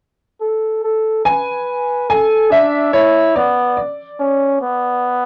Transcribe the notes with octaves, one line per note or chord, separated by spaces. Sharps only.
A4
A4
B4 G#5
A4 G#5
D4 E5
E4 C#5
B3 D5
D5
C#4
B3